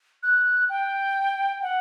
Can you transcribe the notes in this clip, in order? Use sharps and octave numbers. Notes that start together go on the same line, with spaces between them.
F#6
G5
F#5